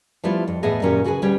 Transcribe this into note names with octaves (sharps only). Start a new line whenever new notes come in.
F3 G3 A3 B3 E4 F4
F2
E2 A2 A3 B3 G#4 D#5
F#2 A#2 D#3 C#4 F#4 G4
C#3 F#4 G#4 B4 G#5
D2 B2 G3 C#4 G4 C#5